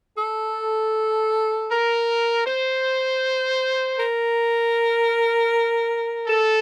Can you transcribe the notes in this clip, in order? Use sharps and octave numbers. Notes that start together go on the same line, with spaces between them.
A4
A#4
C5
A#4
A4